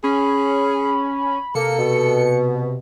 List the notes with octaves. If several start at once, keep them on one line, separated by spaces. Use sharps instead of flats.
C#4 G#4 B5
C3 A#3 A4 C#7
B2